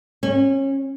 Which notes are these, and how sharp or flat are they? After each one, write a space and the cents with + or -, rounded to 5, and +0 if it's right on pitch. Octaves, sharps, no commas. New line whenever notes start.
C#4 -25